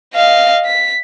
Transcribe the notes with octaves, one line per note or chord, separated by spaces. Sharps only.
D#5 F5
B6